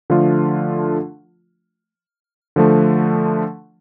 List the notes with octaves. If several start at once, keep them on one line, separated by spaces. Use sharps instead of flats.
D3 F3 A3 D4 F4
D3 F3 A3